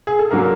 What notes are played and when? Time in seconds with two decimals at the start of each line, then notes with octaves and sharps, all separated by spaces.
0.07 G#4
0.19 A4
0.31 D3 F#3 A#3 A#4